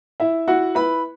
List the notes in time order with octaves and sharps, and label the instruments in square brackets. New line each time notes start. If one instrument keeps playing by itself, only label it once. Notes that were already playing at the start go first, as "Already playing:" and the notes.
[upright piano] E4 E5
E4 F#4 F#5
E4 B4 B5